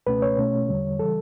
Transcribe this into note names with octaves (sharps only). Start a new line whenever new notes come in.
C#2 B2 A3 C#4 B4
C#5
B2 A3 C#4
E2 D3 G3
C#3 E3 G3 A4